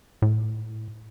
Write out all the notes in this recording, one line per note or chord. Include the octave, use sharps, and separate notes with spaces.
A2